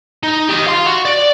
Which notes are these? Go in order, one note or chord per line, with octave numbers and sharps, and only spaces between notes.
D#4
G4 D#5
F5 C6
F#4
D5